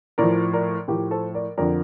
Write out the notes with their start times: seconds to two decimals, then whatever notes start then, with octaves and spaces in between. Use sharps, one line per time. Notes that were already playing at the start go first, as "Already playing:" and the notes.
0.18 A2 F3 A#4 D5
0.53 A#4 D5
0.88 A2 F3 G4 A#4
1.11 A4 C5
1.34 A#4 D5
1.57 F2 D3 F3 A#4 D5